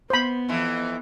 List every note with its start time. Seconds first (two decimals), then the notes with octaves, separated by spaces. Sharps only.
0.10 B3 C5 B5
0.49 F2 E3